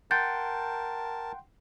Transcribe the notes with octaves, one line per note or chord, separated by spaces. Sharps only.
A#4 F#5 G5 A5 C6 G6 A6